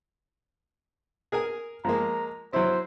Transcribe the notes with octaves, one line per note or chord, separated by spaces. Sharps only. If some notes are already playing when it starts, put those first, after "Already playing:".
G#4 A#4 G#5
F3 G#3 A#3 A#5
F#3 E4 C5